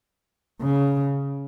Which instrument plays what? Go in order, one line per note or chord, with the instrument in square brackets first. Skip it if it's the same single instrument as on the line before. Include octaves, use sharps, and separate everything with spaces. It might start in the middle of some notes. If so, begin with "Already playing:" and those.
[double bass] C#3